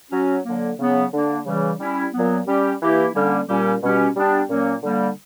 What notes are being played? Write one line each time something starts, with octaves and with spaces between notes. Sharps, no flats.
F#3 C#4 F#4
D3 F#3 A#3
C#3 F#3 B3
D3 A#3 D4
C#3 E3 G3
G3 C#4 E4
A#2 F#3 B3
G3 C#4 G4
E3 A#3 E4 G4
D3 G3 A#3 C#4
A#2 G3 C#4 G4
B2 G3 C#4 G4
G3 B3 D4 G4
A#2 F#3 A#3 C#4
D3 G3 A#3